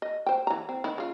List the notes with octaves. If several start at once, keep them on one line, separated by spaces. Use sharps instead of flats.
D#5
C5 G5
E3 A#5
C4
D#3 E4
C#3 F4